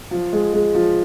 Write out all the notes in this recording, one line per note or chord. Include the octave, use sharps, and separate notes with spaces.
F3
G#3
G#3
F3